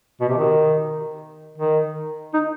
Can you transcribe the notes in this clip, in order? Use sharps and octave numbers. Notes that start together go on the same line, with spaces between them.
B2
C3
D#3
D#3
D#4